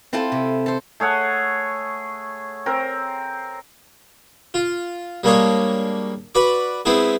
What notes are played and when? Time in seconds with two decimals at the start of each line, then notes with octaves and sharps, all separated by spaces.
0.13 C4 E4 F4 A4 C5 G5
0.32 C3
0.66 A4 C5
1.00 A3 G#4 C#5 F#5
2.66 C4 A#4
4.54 F4
5.24 G3 G#3 A#3 D4 G#4 C#5
6.35 F#4 B4 D5 D6
6.85 G#3 B3 C4 E4 G#4